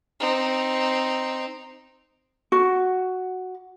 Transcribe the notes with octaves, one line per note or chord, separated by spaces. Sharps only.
C4 D#4
F#4